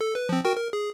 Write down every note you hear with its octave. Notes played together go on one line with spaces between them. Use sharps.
A4
B4
F3 C4
F#4 A#4 G5
A#4
G#4